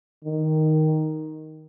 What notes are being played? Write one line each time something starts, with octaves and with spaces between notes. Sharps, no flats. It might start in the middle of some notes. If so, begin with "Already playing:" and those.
D#3